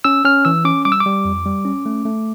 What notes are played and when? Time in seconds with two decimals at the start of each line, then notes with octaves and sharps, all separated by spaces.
0.04 C#4 E6
0.25 C#4 F6
0.45 E3 E6
0.65 C#4 D6
0.85 G3 D6
0.92 E6
1.00 D6
1.06 G3
1.25 F2
1.46 G3
1.65 C#4
1.86 A3
2.05 A3